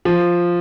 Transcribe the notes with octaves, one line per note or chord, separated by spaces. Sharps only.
F3